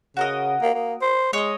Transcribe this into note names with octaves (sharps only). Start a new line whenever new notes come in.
C#3 F#4 A#4 D#5
A#3
A#3
C5
G#3 C#5 D#5